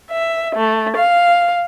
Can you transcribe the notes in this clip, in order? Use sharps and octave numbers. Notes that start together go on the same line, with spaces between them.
E5
A3
F5